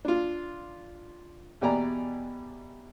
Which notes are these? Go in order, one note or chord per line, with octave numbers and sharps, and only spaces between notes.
D4 F4
E2 B2 G4 D5 G#5 A#5